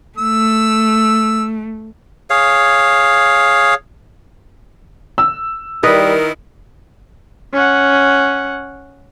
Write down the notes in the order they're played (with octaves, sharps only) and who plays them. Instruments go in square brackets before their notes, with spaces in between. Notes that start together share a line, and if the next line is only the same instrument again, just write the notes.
[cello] A3 [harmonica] E6
[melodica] G#4 C#5 F5
[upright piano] E6
[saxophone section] D#3 E4 A#4 [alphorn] G3 [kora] B4 D#5
[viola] C#4 F#5